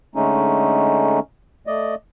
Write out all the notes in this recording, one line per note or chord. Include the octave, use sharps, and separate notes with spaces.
D3 G#3 A3 C#4 D#4
A3 D5 D#5